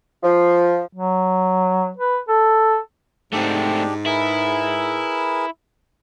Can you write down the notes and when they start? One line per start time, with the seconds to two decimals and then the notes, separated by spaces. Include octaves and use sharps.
0.23 F3
0.93 F#3
1.97 B4
2.29 A4
3.33 G#2 A3 C4 D4 G4 D5
4.06 E4 G#4 A#4 B4